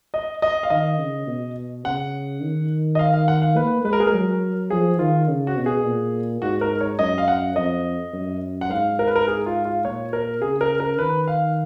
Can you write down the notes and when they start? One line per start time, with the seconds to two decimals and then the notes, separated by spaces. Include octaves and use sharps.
0.14 D#5
0.42 D#5
0.63 F5
0.70 D#3 D#5
0.99 C#3
1.27 B2
1.85 C#3 F#5
2.42 D#3
2.95 D#5
2.99 F5
3.14 F5
3.28 F#5
3.42 F5
3.56 A#3 B4
3.84 G#3 B4
3.93 A#4
4.00 G#4
4.07 A#4
4.14 F#3
4.70 F3 G#4
4.99 D#3 F4
5.28 C#3
5.47 F#4
5.56 B2
5.66 G#4
5.85 A#2
6.42 G#2 F#4
6.61 A#4
6.81 C#5
6.99 F#2 D#5
7.18 F5
7.28 F#5
7.56 F2 D#5
8.13 F#2
8.61 F#5
8.70 G#2 F5
8.99 A#4
9.07 B4
9.16 A#4
9.28 G#4
9.46 F4
9.65 F4
9.85 A#2 C#5
10.13 A#4
10.42 C#3 G#4
10.61 A#4
10.80 A#4
10.99 D#3 B4
11.28 F5